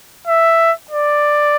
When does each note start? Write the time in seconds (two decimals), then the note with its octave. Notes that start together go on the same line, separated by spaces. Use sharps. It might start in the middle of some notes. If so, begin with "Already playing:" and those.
0.27 E5
0.91 D5